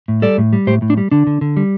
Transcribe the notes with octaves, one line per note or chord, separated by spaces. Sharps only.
A2
G3 A4 D5
A2
G3
A2 G4 C5
A2
D4
G3
D3 D4
D3
D3
G3